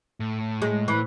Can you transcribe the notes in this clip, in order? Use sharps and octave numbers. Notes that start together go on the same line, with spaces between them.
A2
G#3
E3